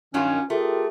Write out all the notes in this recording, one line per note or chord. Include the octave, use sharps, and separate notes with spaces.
G2 D#3 F#3 C#4 F4
A3 F4 G4 G#4 A#4